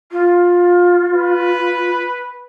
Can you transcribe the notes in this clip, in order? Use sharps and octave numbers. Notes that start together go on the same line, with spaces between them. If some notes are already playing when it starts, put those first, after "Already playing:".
F4
B4